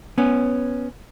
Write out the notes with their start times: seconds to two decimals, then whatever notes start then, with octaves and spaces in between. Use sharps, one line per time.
0.18 B3 C#4